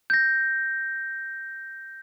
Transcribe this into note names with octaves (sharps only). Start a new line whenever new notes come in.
G6 A#6